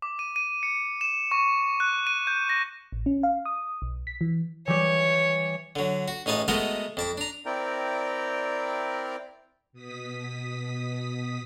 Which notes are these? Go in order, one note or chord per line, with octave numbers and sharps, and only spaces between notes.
D6
D#7
D#7
C#7
E7
C#6
F#6
D#7
G6
A#6
A1
C#4
F5
D#6
B1
B6
E3
E3 G3 G4 C#5
D3 F#3
F#4
A1 D#4 G#4 B4 A5
G#3 A3 B3 F#4 A#4 D#5
F2 A5 D6
D4 A#5
C4 E4 A#4 D5 G5 A#5
B2 D#6 B6